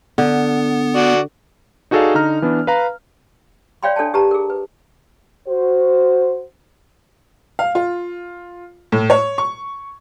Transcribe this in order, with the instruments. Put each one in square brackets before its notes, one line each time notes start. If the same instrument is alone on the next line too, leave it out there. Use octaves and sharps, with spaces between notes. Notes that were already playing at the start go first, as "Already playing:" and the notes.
[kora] D3 [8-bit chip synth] B3
[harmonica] F#4 D5
[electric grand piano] D#4 F#4 G#4 A4 D5 F5
D3 D#4 A#5 F6
E3 B3 D4 D5
B4 F5 A#5
[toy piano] C#5 D5 F5 G5 B5 C6
D4 A4 C#5 G5 A5
G4 B4 A5 A#5
G#4 A#4
B4
[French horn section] F#4 C5
[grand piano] F5
F4
A2
C#5
C#6